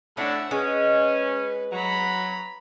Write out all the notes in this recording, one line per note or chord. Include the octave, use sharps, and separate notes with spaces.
A2 C#4 D4 E5 F#5
G#3 C#4 B4
F#3 A#5 B5